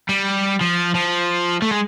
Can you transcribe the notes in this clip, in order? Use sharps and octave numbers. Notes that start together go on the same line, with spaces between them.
G3
F3
F3
A3
G#3